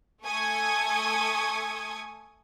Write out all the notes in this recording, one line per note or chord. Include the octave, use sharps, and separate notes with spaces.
A3 A4 G#5 C#6 D#6 G#6